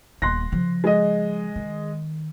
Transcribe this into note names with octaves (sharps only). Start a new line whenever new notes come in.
D#1 B3 C6 F#6 A#6
C#3 F3
G#3 D#5
D#3